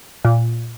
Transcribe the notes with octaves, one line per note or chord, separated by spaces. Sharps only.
A#2